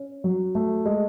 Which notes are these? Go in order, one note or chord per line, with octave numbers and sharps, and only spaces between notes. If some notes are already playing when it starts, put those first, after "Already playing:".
Already playing: C#4
F#3
A3
G#3